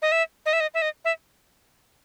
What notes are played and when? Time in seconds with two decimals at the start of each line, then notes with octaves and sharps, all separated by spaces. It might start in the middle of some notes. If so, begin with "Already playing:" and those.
0.02 D#5
0.12 E5
0.46 D#5
0.53 E5
0.60 D#5
0.74 E5
0.82 D#5
1.05 E5